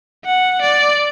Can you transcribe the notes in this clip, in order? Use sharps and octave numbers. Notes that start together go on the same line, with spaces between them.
F#5
D5